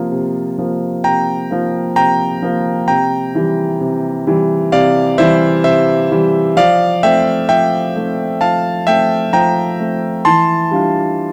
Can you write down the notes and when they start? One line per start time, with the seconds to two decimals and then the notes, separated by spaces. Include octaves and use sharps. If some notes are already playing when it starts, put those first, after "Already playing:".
Already playing: C3 F3 A#3 F4
0.12 C3
0.58 F3 A#3 F4
1.04 C3 G5 A#5
1.50 F3 A#3 F4
1.96 C3 G5 A#5
2.42 F3 A#3 F4
2.88 C3 G5 A#5
3.35 E3 G3
3.80 C3
4.27 E3 G3
4.72 C3 D5 F5
5.18 E3 G3 C5 E5
5.64 C3 C5 E5
6.11 E3 G3
6.56 F3 D5 F5
7.03 A3 C4 E5 G5
7.49 F3 E5 G5
7.96 A3 C4
8.41 F3 F5 A5
8.87 A3 C4 E5 G5
9.33 F3 G5 A#5
9.79 A3 C4
10.25 E3 A5 C6
10.71 G3 D4 F4